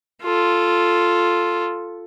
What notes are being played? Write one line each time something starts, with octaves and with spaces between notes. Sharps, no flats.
F4 A4